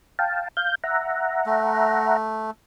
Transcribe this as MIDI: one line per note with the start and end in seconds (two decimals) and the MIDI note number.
0.19 0.48 77
0.19 0.48 79
0.19 0.48 81
0.57 0.75 77
0.57 0.75 91
0.84 2.17 76
0.84 2.17 78
0.84 2.17 82
1.46 2.51 57